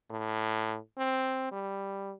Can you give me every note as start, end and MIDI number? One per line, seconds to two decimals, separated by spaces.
0.10 0.78 45
0.97 1.50 60
1.51 2.14 55